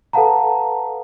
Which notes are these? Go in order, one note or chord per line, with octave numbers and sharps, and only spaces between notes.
A4 B4 F5 F#5 A5 A#5